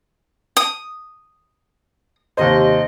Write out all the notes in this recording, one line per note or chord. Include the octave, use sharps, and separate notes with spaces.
D#6
D#2 C3 C5 D#5